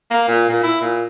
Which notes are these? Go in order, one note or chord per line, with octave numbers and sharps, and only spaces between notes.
A#3
A#2
A#2
E4
A#2